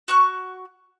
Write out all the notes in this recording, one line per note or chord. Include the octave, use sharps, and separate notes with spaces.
F#4 C#6 F#6